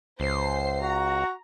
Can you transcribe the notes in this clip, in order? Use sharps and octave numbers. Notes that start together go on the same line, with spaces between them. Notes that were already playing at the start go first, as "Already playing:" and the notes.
C#2 C5 C7
F#4 A#5